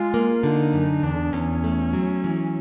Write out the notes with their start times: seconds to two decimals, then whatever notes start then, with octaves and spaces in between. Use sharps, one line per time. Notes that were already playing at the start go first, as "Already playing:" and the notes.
Already playing: G#3 F4
0.14 A#3
0.43 D3 D#4
0.73 F#2
1.03 E2 D4
1.33 E2 C#4
1.64 A3
1.93 F#3
2.24 E3